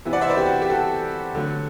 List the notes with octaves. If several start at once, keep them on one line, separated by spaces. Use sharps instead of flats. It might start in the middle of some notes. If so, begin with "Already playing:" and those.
C3 E3 B3 E4
D5 F#5
C5 E5
B4 D5
G4
F#4
G4
F#4 A4
D3 F#3 A3